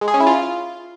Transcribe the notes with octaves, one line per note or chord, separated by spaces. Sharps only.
G#3
G#4
C#4
E4
F4